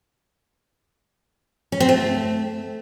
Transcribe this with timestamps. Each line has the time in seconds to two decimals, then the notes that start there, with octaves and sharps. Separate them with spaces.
1.72 C#4
1.80 C4
1.89 A3